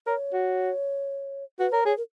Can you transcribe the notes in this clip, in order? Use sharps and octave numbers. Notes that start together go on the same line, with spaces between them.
A#4 C#5
F#4
F#4 B4
A#4 C#5
G#4 C#5
A#4